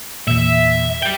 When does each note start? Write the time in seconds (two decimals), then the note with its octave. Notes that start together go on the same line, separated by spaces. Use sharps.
0.28 E2 A#2 E5
1.03 G3 G5